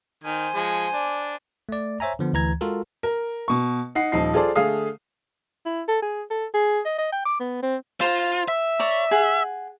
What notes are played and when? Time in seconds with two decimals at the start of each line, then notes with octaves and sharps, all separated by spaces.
0.24 D#3 C5 G#5
0.55 F3 G#3
0.93 D4
1.69 A3 D5
2.00 C5 C#5 E5 G#5 A#5
2.19 D3 F3 B3
2.33 D2 E3 A#5 G#6
2.61 G#3 F4 F#4 A4 A#4
3.03 A#4
3.48 B2 C#6
3.95 D#4 F#5 C7
4.12 D#1 F3 D#4 C7
4.34 F4 G#4 A4 C5 D5
4.56 D3 A3 G#4 F5 D#6
5.66 E4
5.88 A4
6.02 G#4
6.30 A4
6.54 G#4
6.86 D#5
6.99 D#5
7.12 G5
7.25 D6
7.40 B3
7.63 C4
8.01 F4 C5 A#5
8.48 E5
8.79 C#5 D5 A#5
9.11 G#4 F#5